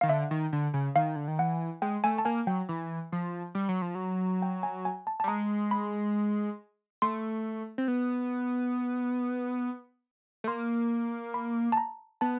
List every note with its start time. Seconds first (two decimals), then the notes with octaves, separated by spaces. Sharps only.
0.01 D#3 F5
0.09 D3 E5
0.31 D#3
0.52 D3
0.74 C#3
0.96 D#3 F5
1.16 D3
1.28 D#3
1.39 E3 F#5
1.82 G#3 G5
2.04 A3 G#5
2.18 A5
2.25 A#3 G#5
2.47 F#3 G5
2.69 E3
3.12 F3
3.55 G3
3.69 F#3
3.82 F3
3.95 F#3
4.42 G5
4.63 G#5
4.85 G#5
5.07 A5
5.20 A5
5.24 G3
5.28 G#3 A#5
5.71 B5
7.02 A3 C6
7.78 C4
7.88 B3
10.44 A3
10.48 A#3 C6
11.34 B5
11.72 A5
11.77 A#5
12.21 B3 A5